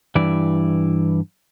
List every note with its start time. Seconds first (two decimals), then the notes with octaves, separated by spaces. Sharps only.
0.15 G2 E3 E4 D5